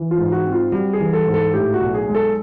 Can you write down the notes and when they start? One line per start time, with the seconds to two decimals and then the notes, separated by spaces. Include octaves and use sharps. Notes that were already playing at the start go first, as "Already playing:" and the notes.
Already playing: E3
0.11 F4
0.18 G#2
0.32 F#4
0.45 C4
0.53 F4
0.72 G3 F#4
0.93 G#4
1.00 E3
1.13 A4
1.27 G#2
1.34 A4
1.54 A2 G4
1.74 F#4
1.81 B1
1.94 G#4
2.08 G#3
2.15 A4